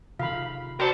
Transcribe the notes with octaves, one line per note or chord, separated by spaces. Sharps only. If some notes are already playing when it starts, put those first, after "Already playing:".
C3 D#3 F4 F5 B5
F#4 A#4 C5 D5 G5 A5 B5